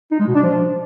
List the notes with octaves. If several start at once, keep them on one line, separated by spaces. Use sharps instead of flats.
D#4
G#3
B2
D4
F3